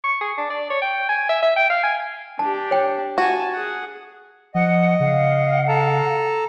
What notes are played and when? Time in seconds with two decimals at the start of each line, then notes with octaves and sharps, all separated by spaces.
0.04 C#6
0.21 G#4
0.38 D4
0.50 D5
0.70 C#5
0.82 G5
1.09 G#5
1.30 E5
1.43 E5
1.56 G5
1.70 F5
1.84 G#5
2.39 D4 G4 A5
2.71 C#5 G5
3.18 F#4 G#5 A5
3.54 G#4 F#5
4.55 F3 D#5 F#5
5.00 C#3 F5 F#5
5.68 A4 A5 A#5